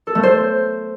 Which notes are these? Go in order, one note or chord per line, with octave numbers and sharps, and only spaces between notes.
A4
A3
C5